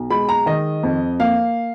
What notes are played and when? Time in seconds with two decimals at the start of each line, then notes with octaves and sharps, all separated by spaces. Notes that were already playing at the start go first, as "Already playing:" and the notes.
Already playing: B1
0.10 G#3 B5
0.29 A#5
0.46 D#3 D#5
0.83 F2
1.20 A#3 F5